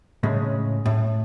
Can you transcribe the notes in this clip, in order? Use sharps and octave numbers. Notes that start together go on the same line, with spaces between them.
A2 C#3 G#3
A2